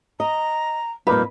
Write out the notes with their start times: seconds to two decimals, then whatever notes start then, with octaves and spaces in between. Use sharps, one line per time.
0.20 D#5 A#5
1.07 F2 A#2 G3 A#3 D#4 B4